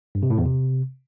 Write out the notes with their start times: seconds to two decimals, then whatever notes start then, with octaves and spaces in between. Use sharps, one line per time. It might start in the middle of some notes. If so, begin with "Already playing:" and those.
0.15 G2
0.23 C3
0.30 A2
0.38 E2
0.46 C3